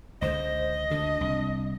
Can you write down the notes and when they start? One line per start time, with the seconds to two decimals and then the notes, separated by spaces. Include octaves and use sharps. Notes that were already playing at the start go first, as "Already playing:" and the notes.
0.22 C#2 D3 C5 D#5
0.90 D2 D3 D4
1.21 C2